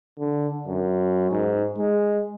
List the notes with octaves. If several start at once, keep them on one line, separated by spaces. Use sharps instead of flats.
D3
F#2
G#2
G#3